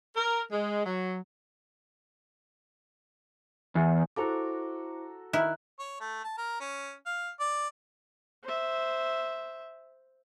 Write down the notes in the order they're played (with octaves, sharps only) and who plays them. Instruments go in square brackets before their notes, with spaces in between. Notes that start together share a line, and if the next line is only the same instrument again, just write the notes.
[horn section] A#4
G#3
F#3
[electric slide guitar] E2
[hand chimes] E4 C5 D6 [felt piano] F#4 A4 A#5
[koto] D#3 E4 [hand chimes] F#6
[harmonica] C#5
A3
A5
A#4
C#4
F5
D5
[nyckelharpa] C5 E5